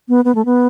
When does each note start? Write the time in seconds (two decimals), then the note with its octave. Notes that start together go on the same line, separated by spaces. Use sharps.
0.09 B3
0.25 B3
0.35 A3
0.45 B3